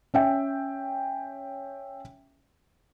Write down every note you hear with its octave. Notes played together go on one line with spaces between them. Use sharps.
C#4 E5 G5